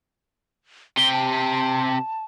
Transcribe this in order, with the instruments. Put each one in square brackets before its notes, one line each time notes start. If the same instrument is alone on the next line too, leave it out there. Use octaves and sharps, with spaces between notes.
[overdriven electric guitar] C3 G4 [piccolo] G7
[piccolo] A5